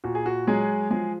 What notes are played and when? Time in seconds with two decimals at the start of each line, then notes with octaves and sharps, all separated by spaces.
0.04 A#2 F#4
0.15 G#4
0.26 F#4
0.47 F#3 G#3 G#4
0.91 F3 G#3 G#4